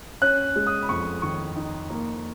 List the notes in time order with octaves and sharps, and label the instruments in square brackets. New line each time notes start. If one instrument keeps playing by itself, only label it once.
[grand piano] C#4 F#6
G#3
D#6
B5
F2 C#6
D#3 C#6
D#4
A#3